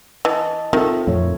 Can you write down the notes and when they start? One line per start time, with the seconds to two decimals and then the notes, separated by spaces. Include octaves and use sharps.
0.25 E3 D#5 A5
0.73 D#3 C4 D#4 F4 A4 E5
1.07 F2 A#2 A3 C#5